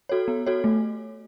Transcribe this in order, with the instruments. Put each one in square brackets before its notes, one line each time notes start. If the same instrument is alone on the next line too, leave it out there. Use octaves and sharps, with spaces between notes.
[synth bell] F#4 A4 C#5
B3
F#4 A4 C#5
A3